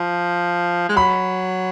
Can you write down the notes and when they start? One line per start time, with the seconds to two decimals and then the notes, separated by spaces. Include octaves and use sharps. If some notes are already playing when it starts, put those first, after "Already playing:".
Already playing: F3
0.89 G#3
0.97 F#3 B5